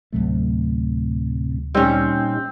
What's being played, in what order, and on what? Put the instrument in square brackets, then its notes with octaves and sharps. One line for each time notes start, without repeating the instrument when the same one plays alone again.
[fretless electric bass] D2 F#3 A3 [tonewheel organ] A2 C3
[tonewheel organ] A#2 D#4 [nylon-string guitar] G3 C#4 [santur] C4